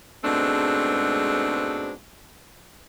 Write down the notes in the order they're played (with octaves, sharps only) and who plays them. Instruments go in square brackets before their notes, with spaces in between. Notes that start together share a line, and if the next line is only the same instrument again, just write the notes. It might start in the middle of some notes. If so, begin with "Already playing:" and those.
[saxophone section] G#2 B2 G#3 A3 C4 D4